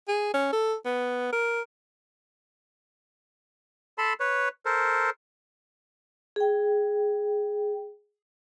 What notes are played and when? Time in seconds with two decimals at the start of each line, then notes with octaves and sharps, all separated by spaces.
0.08 G#4
0.34 C#4
0.53 A4
0.85 B3
1.33 A#4
3.98 A4 A5 B5 C6
4.20 B4 C#5
4.65 A4 A#4 C5
6.36 G#4 G5